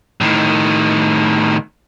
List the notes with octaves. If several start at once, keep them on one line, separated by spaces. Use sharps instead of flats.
A2 D#3